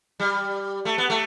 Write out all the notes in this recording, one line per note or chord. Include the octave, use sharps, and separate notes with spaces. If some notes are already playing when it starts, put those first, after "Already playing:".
G3
A3
B3
A3